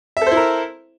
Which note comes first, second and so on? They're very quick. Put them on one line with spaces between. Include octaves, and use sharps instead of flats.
E5 A4 C5 E4 A#4